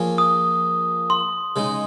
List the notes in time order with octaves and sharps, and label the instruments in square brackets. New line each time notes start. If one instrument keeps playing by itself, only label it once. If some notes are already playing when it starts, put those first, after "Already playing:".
Already playing: [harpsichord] F3 A#3 F4 G#4 C#5
[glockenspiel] D#6
C6
[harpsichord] C#3 G#3 D#4